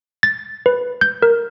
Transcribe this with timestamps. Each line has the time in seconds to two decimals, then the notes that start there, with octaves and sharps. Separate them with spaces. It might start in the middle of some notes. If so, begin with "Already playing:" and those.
0.23 A6
0.66 B4
1.01 G6
1.22 A#4